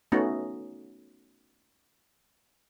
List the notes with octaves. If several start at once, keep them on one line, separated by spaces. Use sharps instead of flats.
A3 B3 C#4 D#4 F#4